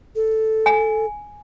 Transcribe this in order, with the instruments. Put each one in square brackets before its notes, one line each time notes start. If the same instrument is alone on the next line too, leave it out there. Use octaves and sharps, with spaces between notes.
[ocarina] A4
[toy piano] G#5